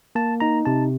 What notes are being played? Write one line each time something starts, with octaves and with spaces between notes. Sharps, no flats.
A#3 A5
D#4 A#5
C3 A5